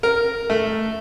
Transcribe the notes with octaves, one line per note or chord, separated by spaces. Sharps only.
A#4
A3